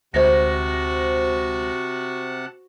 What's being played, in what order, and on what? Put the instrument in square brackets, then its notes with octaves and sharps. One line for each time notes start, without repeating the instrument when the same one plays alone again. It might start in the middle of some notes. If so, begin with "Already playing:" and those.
[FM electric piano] D2 G#3 [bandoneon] C3 F#5 A5 [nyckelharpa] F#4 [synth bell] C5 A#6